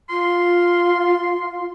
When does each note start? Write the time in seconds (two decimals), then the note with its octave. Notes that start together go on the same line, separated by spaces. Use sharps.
0.10 F4 C6